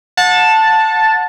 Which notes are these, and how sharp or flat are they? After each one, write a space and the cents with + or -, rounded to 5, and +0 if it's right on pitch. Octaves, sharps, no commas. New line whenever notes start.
F#5 -30 A5 +0